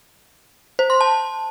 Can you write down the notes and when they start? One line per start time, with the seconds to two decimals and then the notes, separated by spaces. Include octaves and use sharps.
0.79 C5
0.90 C6
1.01 A5